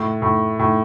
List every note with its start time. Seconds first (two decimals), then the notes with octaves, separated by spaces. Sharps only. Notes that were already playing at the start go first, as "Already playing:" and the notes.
Already playing: A2
0.22 A2
0.59 A2